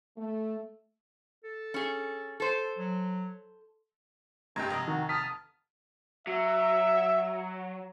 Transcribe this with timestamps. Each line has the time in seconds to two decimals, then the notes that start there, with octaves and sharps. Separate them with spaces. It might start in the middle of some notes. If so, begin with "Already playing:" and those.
0.18 A3
1.44 A4
1.74 C#4 G#4
2.40 A4 C5
2.79 F#3
4.56 G2 G#3 G4 A#5 G#6
4.70 F1 D#5 A#5
4.88 D#3 F#4
5.09 A5 D#6 F6 B6
6.27 F#3 E5